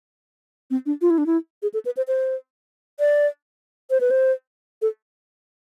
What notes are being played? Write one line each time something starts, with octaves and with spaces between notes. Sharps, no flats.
C4
D4
F4
E4
D4
E4
G#4
A4
B4
C5
C5
D5
C5
B4
C5
A4